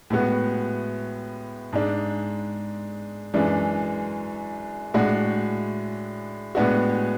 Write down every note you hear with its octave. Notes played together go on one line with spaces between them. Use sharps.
A2 G#3 B3 F#4
G#2 G#3 D4
F#2 E3 G#3 D4
A2 G#3 D4 F#4
A2 G#3 B3 D4 F#4